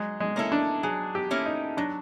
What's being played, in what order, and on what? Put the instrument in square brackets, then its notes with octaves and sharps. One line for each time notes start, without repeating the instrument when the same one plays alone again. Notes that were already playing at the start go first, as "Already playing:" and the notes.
Already playing: [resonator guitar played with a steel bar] F#3 [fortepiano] G#3
[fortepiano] G#3
[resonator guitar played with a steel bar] A#3 C#4 E4 A4
[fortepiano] D4
[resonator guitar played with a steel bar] F#3 [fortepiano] G#4
[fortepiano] G4
[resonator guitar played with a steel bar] A#3 C#4 E4 A4
[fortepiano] D#4
[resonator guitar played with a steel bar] F#3 [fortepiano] D4